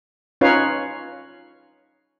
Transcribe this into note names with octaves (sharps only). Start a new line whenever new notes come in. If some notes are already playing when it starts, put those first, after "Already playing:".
C#4 D#4 F4 B4 C#5 F5